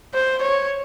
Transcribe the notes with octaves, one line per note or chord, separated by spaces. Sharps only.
C5
C#5